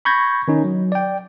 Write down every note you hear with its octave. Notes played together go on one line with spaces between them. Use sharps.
B5 C#6 G6 G#6 A#6
D#3 C#4 D#4
F#3
D5 G5